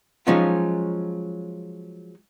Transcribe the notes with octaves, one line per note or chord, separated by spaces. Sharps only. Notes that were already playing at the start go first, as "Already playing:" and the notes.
F3 F#3 G#3 C#4 D#4 F4